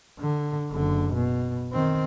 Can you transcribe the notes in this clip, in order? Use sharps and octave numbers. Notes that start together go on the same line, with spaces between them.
D3
F#1 D3
B2
D#3 C4